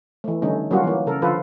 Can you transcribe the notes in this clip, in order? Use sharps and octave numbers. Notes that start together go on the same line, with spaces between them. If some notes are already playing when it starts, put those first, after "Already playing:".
E3 A3
D3 D#3 G3 A3 C#4 D#4
F#3 G3 A#3 C#4 F4 F#4
E3 A#3
C#3 A4 A#4
D3 F3 F4 A4 B4